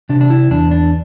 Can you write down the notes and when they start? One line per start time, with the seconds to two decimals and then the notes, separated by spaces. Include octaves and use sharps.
0.09 C3 D4
0.21 D4
0.30 E4
0.51 E2 D4
0.71 D4